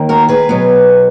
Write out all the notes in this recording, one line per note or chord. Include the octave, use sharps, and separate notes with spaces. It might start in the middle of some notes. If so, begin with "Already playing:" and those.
Already playing: D#2 D#3 A#3
F#4 A#4
G#4 B4
B2 F#3 B3